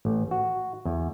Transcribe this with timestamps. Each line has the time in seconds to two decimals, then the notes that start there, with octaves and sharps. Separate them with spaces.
0.05 A1
0.31 F#4
0.85 E2